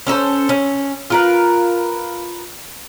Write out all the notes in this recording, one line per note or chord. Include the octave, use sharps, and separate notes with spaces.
C#4 A4 A#4 C5
C#4
F4 A#4 B4